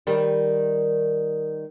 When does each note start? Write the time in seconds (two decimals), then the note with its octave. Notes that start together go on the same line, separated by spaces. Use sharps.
0.07 D#3 G3